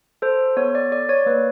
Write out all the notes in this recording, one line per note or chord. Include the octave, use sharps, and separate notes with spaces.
A4 C5
B3 C#5
D5
A4 D5
C#5
A#3 B4